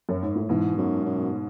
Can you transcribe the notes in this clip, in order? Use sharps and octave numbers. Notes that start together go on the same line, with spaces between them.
F#2
G#2
A2
G#2 B2 E3
F#2
F#2